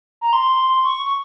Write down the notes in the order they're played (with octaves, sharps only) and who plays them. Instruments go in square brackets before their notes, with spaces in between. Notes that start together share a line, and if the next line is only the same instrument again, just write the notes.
[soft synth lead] A#5
C6
C#6
C#6